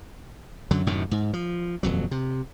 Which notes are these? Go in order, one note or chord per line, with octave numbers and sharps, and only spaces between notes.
F#2 D3 F#3
F#2 A2 C3 D#3
G#2
F3
D#1 F2 F#3
C3